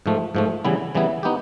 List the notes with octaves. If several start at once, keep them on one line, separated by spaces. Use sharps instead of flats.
G#2 F3 A3
G#2 F3 A3
C#3 E3 G3 B3 E4
C#3 E3 G3 B3 E4
B3 D#4 G4